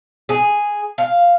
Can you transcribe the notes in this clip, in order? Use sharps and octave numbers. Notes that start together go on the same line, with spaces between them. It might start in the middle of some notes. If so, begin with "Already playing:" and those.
G#4
F5